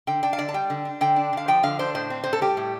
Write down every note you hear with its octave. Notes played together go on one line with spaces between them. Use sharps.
D3 G5
D4 G5
F5
D3 D5
A5
G3 G5
D3
D4
D3 G5
D4
D3 F5
F3 G5
D3 F5
D4 C5
A2 C5
C4
A2 C5
A4
G3 G4
A2